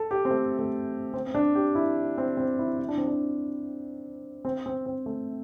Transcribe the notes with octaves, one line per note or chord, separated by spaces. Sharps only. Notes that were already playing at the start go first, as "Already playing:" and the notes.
Already playing: A4
G4
C4
A3
A3
C4
C4
D4
G4
E4
C4
C4
E4
E4
D4
C4
D4
C4
C4
C4
A3